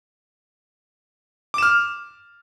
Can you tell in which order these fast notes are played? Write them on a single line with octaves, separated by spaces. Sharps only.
D6 E7 F6